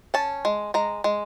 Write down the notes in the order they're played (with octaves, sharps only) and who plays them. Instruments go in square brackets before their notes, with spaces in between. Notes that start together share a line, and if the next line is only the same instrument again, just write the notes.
[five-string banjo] C#4 A5
G#3
G#3 A#5
G#3